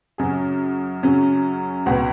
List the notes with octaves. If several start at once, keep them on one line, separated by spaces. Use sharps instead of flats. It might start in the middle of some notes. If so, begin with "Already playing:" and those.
F#2 C#3 F#3 C#4 G#4
F#2 C#3 F#3 C#4
C#2 B2 B3 F#4